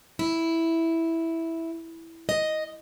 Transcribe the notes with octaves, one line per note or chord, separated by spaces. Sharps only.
E4
D#5